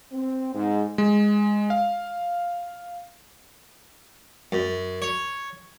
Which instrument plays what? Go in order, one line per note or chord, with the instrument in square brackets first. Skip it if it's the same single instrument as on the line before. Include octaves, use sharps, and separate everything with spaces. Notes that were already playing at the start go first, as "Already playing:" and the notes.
[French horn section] C4
G#2
[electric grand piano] G#3
F5
[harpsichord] F#2
C#5